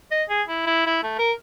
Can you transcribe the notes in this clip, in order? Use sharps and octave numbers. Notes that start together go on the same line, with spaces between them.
D#5
G#4
E4
E4
E4
A3
A#4